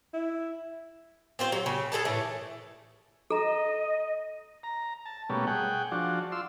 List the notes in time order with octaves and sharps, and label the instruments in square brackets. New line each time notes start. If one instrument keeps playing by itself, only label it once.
[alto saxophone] E4
[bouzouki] C4 F4 C5
F#3
C#3
G#4 A4 G#5 A5
A2 E3 A3
[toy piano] A4 A#5 [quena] D#5
[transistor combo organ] A#5
A5
B2 G3 A3 A#3 C#4
G#4 F#5 G5
F3 D4 F#4
F4 C6 E6